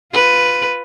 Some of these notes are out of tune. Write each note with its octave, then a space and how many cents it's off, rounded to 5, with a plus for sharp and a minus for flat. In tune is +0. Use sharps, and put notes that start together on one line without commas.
F4 +0 B4 +5